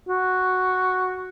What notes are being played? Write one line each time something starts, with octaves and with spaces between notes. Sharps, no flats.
F#4